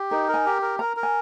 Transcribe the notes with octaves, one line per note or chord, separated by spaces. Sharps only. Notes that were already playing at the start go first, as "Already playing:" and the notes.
Already playing: G4
D#4 A#4
A#4
G#5
G4
A#4
A#4 A#5
A#4
G#5